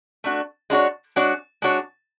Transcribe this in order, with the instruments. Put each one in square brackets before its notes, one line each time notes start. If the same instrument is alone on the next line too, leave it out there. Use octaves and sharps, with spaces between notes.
[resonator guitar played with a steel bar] A3 D4 F#4
G#3 D4 F#4 C#5
G#3 D4 F#4 C#5
G#3 D4 F#4 C#5